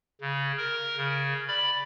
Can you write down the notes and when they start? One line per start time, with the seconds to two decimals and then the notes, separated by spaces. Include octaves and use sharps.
0.21 C#3
0.58 A#4
0.97 C#3
1.48 D5 B5